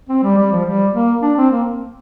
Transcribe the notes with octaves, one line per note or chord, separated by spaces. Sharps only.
C4
G3
G3
F3
G3
A#3
D4
C4
A#3